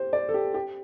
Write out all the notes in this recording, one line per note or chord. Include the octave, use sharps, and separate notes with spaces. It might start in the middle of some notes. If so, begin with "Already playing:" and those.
Already playing: G4 C5
D5
A4
G4
G4